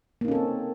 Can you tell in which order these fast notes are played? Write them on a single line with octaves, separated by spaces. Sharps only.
A#3 D#4 C#4 A4 C4